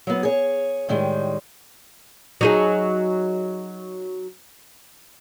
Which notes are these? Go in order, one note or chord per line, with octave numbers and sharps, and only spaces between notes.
F#3 B3
G#4 C#5
A2 D#3 G3 G#3
F#3 D#4 G#4